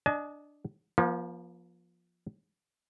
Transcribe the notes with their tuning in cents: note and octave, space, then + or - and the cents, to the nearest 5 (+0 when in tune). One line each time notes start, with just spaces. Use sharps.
D4 +0 D#5 +0 G#5 +40
F3 +0 A#3 +45